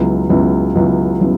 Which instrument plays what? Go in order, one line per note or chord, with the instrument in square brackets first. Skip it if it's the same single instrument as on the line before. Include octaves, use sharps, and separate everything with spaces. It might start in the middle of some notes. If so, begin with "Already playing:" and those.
Already playing: [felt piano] C#2 C#3 F#3 B3 E4
C#2 C#3 F#3 B3 E4
C#2 C#3 F#3 B3 E4
C#3 F#3 B3 E4